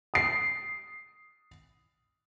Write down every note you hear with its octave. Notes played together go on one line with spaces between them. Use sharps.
D#6 C7